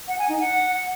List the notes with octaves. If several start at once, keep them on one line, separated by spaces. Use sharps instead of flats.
F#5
G#5
D#4
F#5